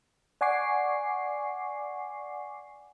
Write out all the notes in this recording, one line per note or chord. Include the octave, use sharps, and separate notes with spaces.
D5 F#5 G#5 C#6 D6 C7